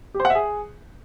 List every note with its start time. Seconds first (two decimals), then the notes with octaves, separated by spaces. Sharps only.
0.14 G4
0.20 C5
0.25 F#5
0.30 E5
0.35 G#4